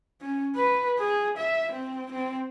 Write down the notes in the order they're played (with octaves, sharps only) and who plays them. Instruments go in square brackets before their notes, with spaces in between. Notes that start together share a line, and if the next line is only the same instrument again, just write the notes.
[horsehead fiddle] C#4
B4
G#4
E5
C4
C4